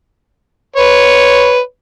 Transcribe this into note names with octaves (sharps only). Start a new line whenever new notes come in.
B4 C#5